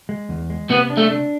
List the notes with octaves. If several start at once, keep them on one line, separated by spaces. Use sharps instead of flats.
G#3
E2
G#3
C3 B3
D4
A3
D4